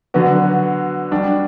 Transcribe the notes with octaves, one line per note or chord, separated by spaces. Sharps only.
D3 F#3 B3 F#4
G3 D4 F#4